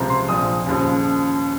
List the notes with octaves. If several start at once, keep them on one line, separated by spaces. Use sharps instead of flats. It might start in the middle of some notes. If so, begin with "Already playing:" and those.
Already playing: C#2 C3 F3 A#5
C6
A#1 A#2 F3 D#6
D#2 C#3 F3